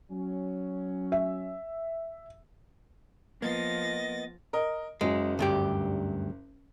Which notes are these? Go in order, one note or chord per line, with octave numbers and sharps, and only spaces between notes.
F#3 C#4
E5
F3 A#3 B3 D#5 A6 A#6
A#4 D#5
F#1 F#3 G#3
D2 G2 G4